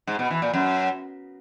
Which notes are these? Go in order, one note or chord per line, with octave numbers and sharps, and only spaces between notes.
G#2
B2
E3
A#2
F#2